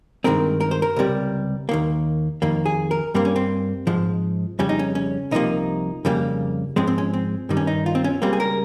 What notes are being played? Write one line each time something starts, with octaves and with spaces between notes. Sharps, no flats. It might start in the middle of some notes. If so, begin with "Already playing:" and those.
G2 D#3 G#3 C4 A#4
A#4
C5
A#4
C#2 C3 G3
D#2 D#3 A#3
F2 D#3 A#3
G#4
A#4
G2 G3 A#3 C4
C#4
C4
G#2 F3 G#3
F2 C#3 G3 C#4
D#4
C#4
C#4
C2 C3 F3 A#3 D#4
F2 C#3 G3 A#3
G#2 F3 G#3 C4 C#4
C4
C#4
C4
G2 D#3 G3
C#4
D#4
F4
C4
C#4
C#2 C#3 G3 A#3 C4
G#4
A#4